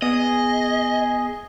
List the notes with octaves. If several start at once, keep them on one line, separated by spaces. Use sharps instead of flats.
B3 G#4 D#5